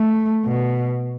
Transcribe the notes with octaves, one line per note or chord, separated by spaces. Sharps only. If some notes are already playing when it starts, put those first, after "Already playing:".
Already playing: A3
B2